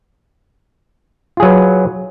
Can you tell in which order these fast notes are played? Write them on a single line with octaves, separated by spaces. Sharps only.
F4 G#4 F#3 B4